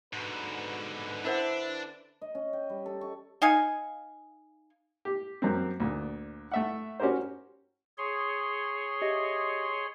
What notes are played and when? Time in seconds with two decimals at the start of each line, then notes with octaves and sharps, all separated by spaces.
0.13 G#2 B2 D3 B4
1.24 D4 E4 C5 E5 F#5
2.21 D#5
2.35 C#4
2.53 G5
2.69 G3
2.86 A4
3.01 C#6
3.42 D#4 F5 G#5
5.05 G4
5.42 F#2 A#3 C4
5.80 D2 A#2
6.51 A3 E5 F#5
7.00 C#4 F#4 G4 A#4 C5
7.98 G#4 C#5 C6
9.02 G4 D#5 E5